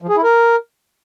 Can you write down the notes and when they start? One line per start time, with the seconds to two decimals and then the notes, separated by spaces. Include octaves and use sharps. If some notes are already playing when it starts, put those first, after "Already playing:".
0.02 F3
0.09 G#4
0.16 E4
0.24 A#4